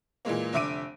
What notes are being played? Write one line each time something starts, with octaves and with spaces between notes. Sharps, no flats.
A#2 E3 G#3 A#3
F1 D3 E5 D6 D7 D#7